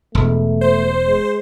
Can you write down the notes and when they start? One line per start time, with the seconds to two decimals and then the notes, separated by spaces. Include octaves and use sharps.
0.15 E1 A3
0.61 C5
1.06 G#3